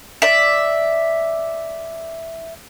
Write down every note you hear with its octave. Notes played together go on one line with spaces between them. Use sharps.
D5 E5